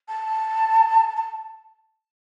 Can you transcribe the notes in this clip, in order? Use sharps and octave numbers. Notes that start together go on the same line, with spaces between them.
A5
A5